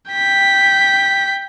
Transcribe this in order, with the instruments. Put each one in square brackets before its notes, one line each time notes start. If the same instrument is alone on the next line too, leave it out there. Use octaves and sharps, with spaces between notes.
[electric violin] G5 B6